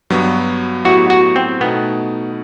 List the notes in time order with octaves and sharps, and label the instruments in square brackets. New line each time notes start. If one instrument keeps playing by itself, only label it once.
[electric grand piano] G2 F#3 B3 F#4
[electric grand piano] A2 F#3 B3 E4 G4 [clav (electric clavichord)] F#4
[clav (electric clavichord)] F#4
C4
[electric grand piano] B2 A3 D#4 [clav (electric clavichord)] B3